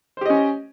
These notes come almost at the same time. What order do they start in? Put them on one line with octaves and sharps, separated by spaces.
C5 G4 D#5 C#4